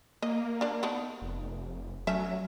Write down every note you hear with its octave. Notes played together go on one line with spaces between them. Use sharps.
A#3 D#5
D4 D5
B3 D4 D#4
F1
F#3 A3 C#4 E5